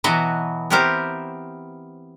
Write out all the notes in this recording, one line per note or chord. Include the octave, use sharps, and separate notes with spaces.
B2 E3 F#3 B3 F#4 D#5
B3 C4 E4 G4 A#4 C5